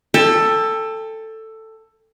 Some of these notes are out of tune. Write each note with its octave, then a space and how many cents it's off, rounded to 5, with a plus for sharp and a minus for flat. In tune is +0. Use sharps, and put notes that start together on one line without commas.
A4 +10 G5 +40